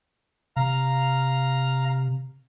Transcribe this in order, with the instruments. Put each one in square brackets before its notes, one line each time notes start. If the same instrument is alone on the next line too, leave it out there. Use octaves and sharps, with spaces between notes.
[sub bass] C3 [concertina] F5 A#5